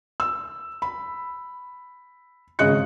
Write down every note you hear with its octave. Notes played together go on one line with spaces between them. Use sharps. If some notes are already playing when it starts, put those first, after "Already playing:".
E6
B5
G#1 C#3 G#4 D#5 F#6 C#7